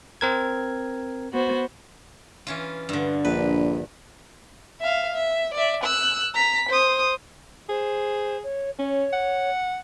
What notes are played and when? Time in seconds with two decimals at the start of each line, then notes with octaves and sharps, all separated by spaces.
0.21 C4 A#4 G#6
1.32 B3 F#4 C5
2.47 E3 C#4 F4
2.89 G2 D3
3.25 A#1 B4
4.81 E5 F5
5.15 E5
5.54 D5 E5
5.84 E6 F#6
6.34 A#5 B6
6.69 C5 D#6
7.69 G#4 C5
8.43 C#5
8.79 C#4 C#5
9.13 F#5